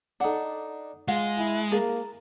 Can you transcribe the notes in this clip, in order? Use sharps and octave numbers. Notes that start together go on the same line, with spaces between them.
D4 D#4 A4 F#5
G#3 F4 F#5
E4 G#5
A#3 G#4 A5 A#5